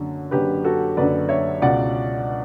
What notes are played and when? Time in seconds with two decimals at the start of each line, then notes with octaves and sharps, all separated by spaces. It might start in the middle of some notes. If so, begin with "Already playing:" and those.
Already playing: F#1 F#2 D3
0.31 F#1 F#2 D3 G4 B4
0.64 F#4 A4
0.97 F#1 F#2 D3 B4 D5
1.29 C#5 E5
1.62 C#2 B2 D5 F#5